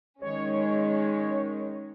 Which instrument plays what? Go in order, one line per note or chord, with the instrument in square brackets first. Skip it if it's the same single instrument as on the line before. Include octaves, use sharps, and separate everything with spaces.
[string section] D#3 G#3 C#4 [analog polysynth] C#5